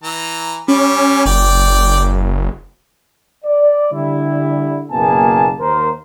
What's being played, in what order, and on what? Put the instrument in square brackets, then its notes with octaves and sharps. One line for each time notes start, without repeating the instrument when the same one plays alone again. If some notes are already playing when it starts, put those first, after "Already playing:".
[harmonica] E3 A#5
[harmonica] G3 [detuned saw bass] C#4
[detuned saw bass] F#1 [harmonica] D5 G5
[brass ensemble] D5
D3 G3 E4
F#1 B2 A#3 G#4 G#5 A5
D#2 A#4 C5